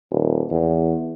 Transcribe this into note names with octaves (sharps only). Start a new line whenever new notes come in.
D#1
E2